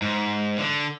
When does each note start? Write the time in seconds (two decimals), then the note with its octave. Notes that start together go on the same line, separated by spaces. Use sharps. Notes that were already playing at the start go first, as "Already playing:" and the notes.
0.02 G#2
0.58 D3